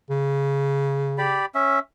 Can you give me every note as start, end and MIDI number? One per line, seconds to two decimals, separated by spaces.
0.10 1.40 49
1.18 1.46 67
1.18 1.46 74
1.18 1.46 83
1.55 1.79 61
1.55 1.79 76